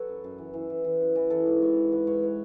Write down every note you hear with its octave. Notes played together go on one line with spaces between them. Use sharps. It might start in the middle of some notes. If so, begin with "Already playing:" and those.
Already playing: F#3 A4 B4 C#5
F#2
F#2
E3
E3
E3
E3
F#2
E3
E3 A4
G#2
G#2 C#5
E3
G#2 B4
G#2 C#5
E3 B4